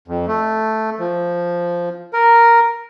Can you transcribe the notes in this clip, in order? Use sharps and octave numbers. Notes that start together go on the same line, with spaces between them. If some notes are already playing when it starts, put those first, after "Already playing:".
F2
A3
F3
A#4